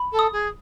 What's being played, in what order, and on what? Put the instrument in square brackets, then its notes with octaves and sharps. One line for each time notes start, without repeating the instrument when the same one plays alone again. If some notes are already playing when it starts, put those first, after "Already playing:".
Already playing: [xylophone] B5
[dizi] A4
[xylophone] D#6
[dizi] G#4